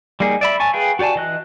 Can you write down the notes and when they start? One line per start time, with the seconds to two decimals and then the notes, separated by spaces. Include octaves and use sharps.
0.20 G3 A#3 D#4 G#4
0.41 D5 E5 B5
0.60 G#5 A5 C#6
0.73 G#4 B4 F5 G5 G#5
0.99 F#4 G4 D5 G#5 A5
1.16 E3 D#5 F#6